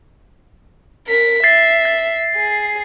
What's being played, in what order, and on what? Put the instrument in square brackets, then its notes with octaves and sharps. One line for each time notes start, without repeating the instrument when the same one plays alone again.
[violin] A#4 B6
[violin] E5 [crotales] A6 C7
[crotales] A6
[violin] G#4